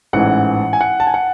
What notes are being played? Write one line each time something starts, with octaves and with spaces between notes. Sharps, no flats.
A1 G#2 E3 F#5
G#5
F#5
A5
G#5
F#5